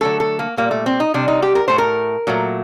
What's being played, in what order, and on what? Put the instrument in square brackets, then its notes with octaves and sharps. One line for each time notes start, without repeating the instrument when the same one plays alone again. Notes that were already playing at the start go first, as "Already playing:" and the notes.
[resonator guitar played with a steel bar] D3 F#3 A3 A4
A4
A#3
A#2 G3 A#3
A3
C4
D#4
C3 G3 D4
D#4
G4
A#4
A2 A3 C5
A#4
A#2 F#3 A3